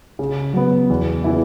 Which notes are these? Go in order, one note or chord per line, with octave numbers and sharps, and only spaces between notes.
C#3
F#3 B3
E2
C#3 E3 B3 E4